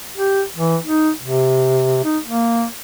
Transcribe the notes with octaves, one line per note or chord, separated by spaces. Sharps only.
G4
E3
D#4
C3
D#4
A#3